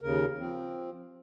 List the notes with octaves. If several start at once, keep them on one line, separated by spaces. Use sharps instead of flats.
D#2 C#3 A#4
F3 C4